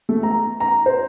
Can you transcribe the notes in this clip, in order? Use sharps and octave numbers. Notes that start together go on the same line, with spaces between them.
A3
A#5
A#5
C5